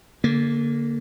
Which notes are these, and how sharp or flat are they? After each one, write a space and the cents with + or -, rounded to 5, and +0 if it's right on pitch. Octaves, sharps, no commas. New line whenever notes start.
D3 -30 A#3 +0